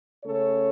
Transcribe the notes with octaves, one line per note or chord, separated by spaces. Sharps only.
C#3 A3 C#4 A4 C#5